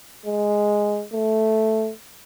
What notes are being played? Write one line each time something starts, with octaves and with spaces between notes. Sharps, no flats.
G#3
A3